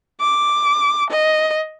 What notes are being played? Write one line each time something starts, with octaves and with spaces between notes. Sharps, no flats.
D6
D#5